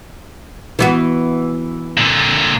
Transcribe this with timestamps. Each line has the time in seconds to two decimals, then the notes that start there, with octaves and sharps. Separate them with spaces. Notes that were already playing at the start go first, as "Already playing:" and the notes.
0.79 E3 B3 F#4
1.98 A#2 D3